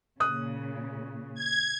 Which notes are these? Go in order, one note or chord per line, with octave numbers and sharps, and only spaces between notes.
A#2 C#3 D#6 F#6
G#6